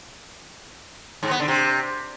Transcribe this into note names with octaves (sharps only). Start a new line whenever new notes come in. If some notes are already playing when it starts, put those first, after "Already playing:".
G#2
B3
D3
C3